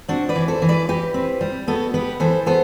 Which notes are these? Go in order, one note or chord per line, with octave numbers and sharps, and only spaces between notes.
C4 D4 F#4
B4 D5
E3
A4 C5
E3
B4 D5
E3 G4 B4
C4
G3
B3 F#4 A4
B3 G4 B4
E3 A4 C5
B3 A4 C5